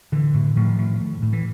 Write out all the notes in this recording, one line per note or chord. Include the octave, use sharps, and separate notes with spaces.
A2 D3 E3
A2
A2 D#3 F3
A2
A2
A2
E3